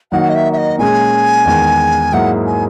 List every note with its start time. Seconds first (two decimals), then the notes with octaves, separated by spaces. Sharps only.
0.12 D#3 F#3 A#3 D#4 F#4 F#5
0.29 D#5
0.34 E5
0.53 E5
0.57 D#5
0.78 A#2 G#3 C#4 G#4 G#5
1.46 E2 D#3 G#3
2.12 G#2 F#3 A#3 E4 G#4 F#5
2.46 G#5